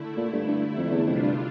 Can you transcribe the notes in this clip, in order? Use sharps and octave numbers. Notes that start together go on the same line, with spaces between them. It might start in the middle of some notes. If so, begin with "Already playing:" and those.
Already playing: D3 A3 E4
A#2
G2
G2
F2
E2
F2 C3 G3 D4 F4
G2